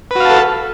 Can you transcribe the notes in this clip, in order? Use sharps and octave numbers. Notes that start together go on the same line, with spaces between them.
F#4 A4 B4 F5 A5